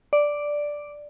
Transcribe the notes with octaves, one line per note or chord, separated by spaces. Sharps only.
D5